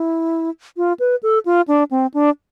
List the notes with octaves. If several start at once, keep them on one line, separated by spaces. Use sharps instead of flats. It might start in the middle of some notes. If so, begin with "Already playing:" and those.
Already playing: E4
F4
B4
A4
F4
D4
C4
D4